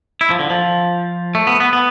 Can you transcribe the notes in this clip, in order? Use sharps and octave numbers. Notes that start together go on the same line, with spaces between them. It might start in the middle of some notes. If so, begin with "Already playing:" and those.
E4
F3
D3
F3
A3
B3
B3
B3